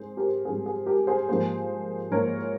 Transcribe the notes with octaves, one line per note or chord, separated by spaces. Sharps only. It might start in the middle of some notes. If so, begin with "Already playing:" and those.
Already playing: G#2 C4 G#4 C5
G4 A#4
G#2 G3 C4 G#4
G#4
G4 A#4
G#4 C5
G#2 F3 A#3 G#4 C5
G#2 F3 A#3 A#4 C#5